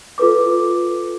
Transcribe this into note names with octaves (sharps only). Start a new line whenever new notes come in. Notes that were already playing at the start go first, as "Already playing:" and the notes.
F4 A4 B4 D6